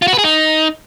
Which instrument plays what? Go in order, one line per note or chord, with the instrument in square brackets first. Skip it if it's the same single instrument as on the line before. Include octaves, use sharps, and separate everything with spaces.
[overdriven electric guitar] F4
F#4
B4
G#4
D#4